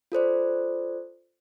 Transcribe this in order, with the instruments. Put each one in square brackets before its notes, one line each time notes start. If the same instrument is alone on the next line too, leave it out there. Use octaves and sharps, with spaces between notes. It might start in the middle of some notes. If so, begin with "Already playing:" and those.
[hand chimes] F4 A4 C5 D5